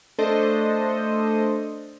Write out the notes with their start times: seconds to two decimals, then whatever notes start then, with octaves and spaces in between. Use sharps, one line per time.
0.18 A3 D4 A4 C5 D#5